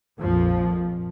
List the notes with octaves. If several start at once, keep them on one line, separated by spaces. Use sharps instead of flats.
A#1 F2 A#2 F3